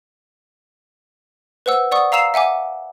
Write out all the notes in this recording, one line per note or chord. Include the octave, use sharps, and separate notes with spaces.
B4 C5 F#5 E6
D5 F#5 C#6 D#6
F5 A#5 E6 C7 E7 F7
E5 F#5 G#5 D6